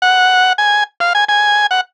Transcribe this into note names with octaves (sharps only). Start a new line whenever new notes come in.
F#5
G#5
F5
G#5
G#5
F#5